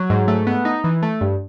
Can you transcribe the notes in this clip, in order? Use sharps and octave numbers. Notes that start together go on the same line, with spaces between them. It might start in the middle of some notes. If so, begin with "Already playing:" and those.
Already playing: F#3
G#2
A3
B3
D#4
E3
A3
G2